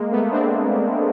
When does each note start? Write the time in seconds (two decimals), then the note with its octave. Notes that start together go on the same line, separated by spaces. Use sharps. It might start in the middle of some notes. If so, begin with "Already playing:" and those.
Already playing: G#3 A#3
0.11 A3 B3
0.31 C4 D4